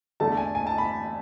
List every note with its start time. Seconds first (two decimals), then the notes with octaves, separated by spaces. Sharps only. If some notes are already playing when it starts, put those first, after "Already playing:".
0.20 E2 D3 A3 A5
0.37 G#5
0.55 G#5
0.67 A5
0.78 B5